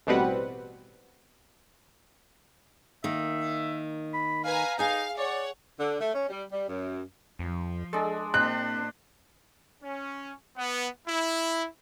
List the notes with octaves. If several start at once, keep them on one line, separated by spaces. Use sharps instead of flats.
A1 B2 G3 C4 B4 F#5
D#3 A#3 E5
B5
B4 F5 G#5 A#5
D#4 G#4 F5 G#5
C#5 D5 F#5
D3
A3
C#4
G3
G3
F#2
F2 F3
G#3 D4 A4
A#2 C4 D4 C5 F#6
C#4
B3
E4